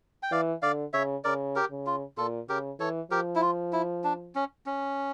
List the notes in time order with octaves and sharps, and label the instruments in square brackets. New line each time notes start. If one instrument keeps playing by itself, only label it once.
[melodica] G5
[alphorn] E3 [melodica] D5 F5
[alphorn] D3 [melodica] D5 F5
[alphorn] C#3 [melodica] C#5 E5
[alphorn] C#3 [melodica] A#4 D5
[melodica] G4 A#4
[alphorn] C#3
[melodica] F4
[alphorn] A#2 [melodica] F4 A4
[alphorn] C#3 [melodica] G4 A#4
[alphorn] E3 [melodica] A4 C#5
[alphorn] F3 [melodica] G4 A#4
[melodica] E4
F4
E4
D4
C#4
C#4